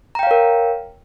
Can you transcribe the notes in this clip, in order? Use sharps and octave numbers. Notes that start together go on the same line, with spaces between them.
A#4 C#5 F5 G5 A#5